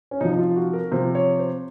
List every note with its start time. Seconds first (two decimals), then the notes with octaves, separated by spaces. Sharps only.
0.11 C#4
0.21 C3 D#4
0.24 F3
0.32 D#4
0.38 F4
0.56 F#4
0.73 A#4
0.91 C3 F3 C5
1.15 C#5
1.39 C5